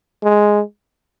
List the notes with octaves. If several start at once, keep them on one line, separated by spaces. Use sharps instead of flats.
G#3